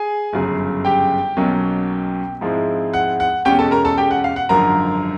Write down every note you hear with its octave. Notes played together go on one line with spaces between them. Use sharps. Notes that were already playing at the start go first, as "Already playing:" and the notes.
Already playing: G#4 G#5
G1 F#2 C#3
G4 G5
B1 B2 F#3 A#3 C#4
G#2 F3 G#3 C4 E4
F#5
F#5
E2 B2 G#3 C#4 G4 G5
A4 A5
A#4 A#5
A4 A5
G4 G5
F#5
F5
F#5
G#1 F#2 D3 F3 A#4 A#5